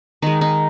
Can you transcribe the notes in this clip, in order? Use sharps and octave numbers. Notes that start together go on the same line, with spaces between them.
D#3 G#3 D#4
D#4